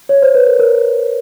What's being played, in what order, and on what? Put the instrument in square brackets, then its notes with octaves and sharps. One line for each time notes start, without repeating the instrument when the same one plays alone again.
[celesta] C#5
C5
B4
A#4
A#4